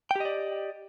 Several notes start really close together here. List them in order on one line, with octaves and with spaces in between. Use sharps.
G5 G4 D#5 D5